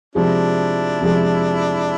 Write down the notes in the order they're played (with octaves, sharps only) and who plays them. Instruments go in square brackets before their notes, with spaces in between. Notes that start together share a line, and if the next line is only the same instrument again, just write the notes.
[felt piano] C3 F3 G#3 [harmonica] D4 E4
[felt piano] C3 F3 G#3